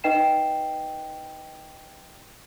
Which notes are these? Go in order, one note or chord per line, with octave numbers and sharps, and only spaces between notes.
D#4 B4 D#5 G5 C7 E7